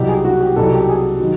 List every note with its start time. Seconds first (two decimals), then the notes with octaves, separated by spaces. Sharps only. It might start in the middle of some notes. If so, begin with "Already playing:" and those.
Already playing: C2 B2 F#3 G4
0.08 G#4
0.25 F#4
0.41 G4
0.56 C2 B2 F#3 A4
0.73 G4
0.89 G#4
1.20 D#3 F#3